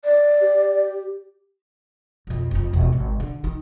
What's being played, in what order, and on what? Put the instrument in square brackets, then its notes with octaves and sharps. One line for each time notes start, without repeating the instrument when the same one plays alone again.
[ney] D5
[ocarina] G4
[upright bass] B1 F2
F1 F2
E1
G#1 C3
D3
D#3